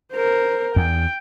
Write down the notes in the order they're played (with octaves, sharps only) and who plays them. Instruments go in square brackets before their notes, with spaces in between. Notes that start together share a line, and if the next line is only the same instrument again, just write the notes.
[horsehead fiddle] A#4 C5
[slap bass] E2 [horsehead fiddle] G5